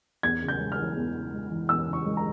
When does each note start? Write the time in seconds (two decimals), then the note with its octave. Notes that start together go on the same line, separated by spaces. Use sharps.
0.23 E2 G#6
0.42 C#3
0.48 G6
0.60 G#3
0.72 F6
0.78 E3
0.97 E2
1.14 C#3
1.32 G#3
1.50 E3
1.68 E2 E6
1.86 C#3
1.93 C#6
2.05 G#3
2.17 A#5